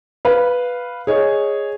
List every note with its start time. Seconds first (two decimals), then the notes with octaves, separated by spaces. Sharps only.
0.25 B4 F5
1.07 G#4 C#5 D#5